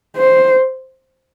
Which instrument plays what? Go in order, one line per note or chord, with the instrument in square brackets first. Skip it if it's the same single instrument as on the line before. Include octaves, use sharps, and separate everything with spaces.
[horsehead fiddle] C5